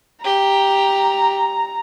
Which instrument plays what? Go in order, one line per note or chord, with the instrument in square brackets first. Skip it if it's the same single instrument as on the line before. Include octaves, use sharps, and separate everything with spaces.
[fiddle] G4 [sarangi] A#5